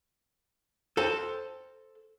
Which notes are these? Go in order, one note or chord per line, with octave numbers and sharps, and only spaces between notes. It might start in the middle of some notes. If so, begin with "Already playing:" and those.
A4 C5 A5